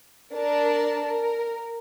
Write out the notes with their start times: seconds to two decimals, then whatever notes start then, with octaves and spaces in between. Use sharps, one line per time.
0.34 D4 A#4 A5
1.05 A#4